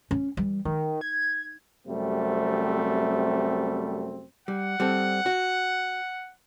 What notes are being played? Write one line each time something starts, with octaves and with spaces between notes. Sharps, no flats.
C#4
E3 G3
D#3 D#4
G#6
F#2 C3 G3 A3 C4
G3 F#5
G3 C4 A4
F#4